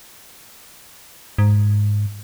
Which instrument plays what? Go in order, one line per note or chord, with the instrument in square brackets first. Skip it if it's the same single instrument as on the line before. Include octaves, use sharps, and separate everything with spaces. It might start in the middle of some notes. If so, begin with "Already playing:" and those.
[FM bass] G#2